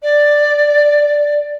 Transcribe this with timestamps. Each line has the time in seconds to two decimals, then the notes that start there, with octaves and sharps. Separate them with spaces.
0.02 D5